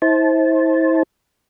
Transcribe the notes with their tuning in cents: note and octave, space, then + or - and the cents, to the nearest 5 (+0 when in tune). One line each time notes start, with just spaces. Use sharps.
E4 -35 C5 +15 A5 -20